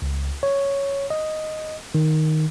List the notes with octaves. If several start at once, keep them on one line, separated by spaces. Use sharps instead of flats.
C#2
C#5
D#5
D#3